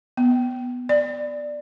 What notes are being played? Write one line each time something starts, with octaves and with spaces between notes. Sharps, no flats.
B3
D5